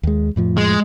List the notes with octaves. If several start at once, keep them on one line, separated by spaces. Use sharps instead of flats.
D#2 G#3
F2 A2 F3
G#3